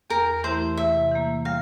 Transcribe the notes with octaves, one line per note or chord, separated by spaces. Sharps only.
E2 A#4
E3 A3 E4 G4 C5
C3 E5
E3 A#3
G3 F5